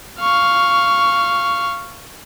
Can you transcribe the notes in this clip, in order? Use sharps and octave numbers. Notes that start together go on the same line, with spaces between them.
F5 C#6